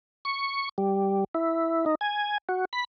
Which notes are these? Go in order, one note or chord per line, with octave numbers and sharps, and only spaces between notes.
C#6
G3
E4
D#4
G#5
F#4
B5